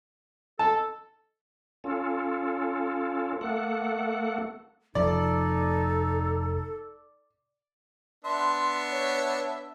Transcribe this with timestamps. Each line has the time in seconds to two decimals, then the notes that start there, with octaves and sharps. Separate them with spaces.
0.59 A4 A5
1.84 C#4 F4 A4
3.41 A3 A#3 A4 F#5
4.95 F1 F3 D#4 A4 D5
8.25 B3 D4 E5 C6
8.91 C#5